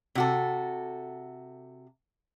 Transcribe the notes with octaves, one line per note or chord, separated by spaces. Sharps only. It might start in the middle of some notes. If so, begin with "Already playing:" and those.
C3 F#4 A4